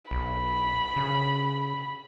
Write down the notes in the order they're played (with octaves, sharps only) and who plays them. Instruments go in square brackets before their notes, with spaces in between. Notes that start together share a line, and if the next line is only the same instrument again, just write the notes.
[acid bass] B1 [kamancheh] B5
[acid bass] C#3